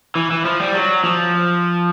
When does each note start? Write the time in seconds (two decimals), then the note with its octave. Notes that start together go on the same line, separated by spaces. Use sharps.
0.15 E3
0.31 E3
0.45 F3
0.60 G3
0.74 F#3
1.04 F3